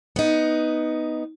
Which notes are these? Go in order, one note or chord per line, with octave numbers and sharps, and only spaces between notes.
B3 D#4